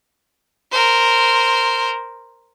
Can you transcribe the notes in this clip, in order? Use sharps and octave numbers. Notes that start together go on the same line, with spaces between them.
A#4 C5